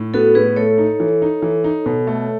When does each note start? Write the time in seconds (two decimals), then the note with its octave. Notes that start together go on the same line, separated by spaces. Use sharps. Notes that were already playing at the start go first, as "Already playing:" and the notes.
Already playing: A2
0.14 B3 F#4 A4
0.35 A2 G#4 B4
0.56 A3 A4 C#5
0.78 D#4
1.00 E3
1.22 D#4
1.42 E3
1.64 D#4
1.86 B2
2.07 A3